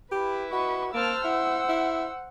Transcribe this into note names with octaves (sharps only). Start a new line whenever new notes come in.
E4 G4 B4
F#4 D#5 C#6
A#3 C5 A5 E6 F6
E4 F#5
E4